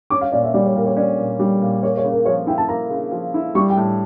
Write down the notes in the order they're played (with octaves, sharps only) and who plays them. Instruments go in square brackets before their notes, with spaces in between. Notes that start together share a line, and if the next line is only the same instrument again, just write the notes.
[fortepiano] C#4 [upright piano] D6
[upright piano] F5
[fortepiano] A#2 [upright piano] D5
[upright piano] E5
[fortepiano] G3 [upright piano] D5
[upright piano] C#5
[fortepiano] A#2 [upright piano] A#4
[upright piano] C#5
[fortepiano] C#4 [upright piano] D5
[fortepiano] A#2
G3
A#2
[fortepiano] A#3 [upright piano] C#5
[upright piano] C#5
[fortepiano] C#3
[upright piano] A#4
[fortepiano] F3 [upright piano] C#5
[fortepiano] E4 [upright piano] G5
[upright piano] A5
[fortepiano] A#3 [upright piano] A#5
[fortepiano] C#3
F3
E4
[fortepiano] G3 [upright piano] C#6
[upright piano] G5
[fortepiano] A2